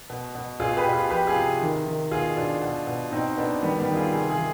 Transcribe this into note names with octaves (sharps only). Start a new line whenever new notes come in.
B2
B2
B2 F4 G#4
G4 B4
B2
F4 G#4
F3 G4 B4
F4 G#4
C3
D#3
D#3
B2 F4 G#4
B2 D4 F4
B2
B2
B2 C4 D#4
B2 B3 D4
D#3 G3 B3
G3 B3
D#3
F4 G#4
C3 F4 G#4
F4 G#4
D#3